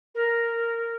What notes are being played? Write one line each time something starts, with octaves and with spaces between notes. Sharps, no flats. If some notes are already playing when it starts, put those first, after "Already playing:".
A#4